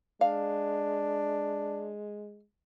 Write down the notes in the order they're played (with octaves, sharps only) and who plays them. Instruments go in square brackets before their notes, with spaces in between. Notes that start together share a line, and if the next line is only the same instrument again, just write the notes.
[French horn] G#3 [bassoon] D4 [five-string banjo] F5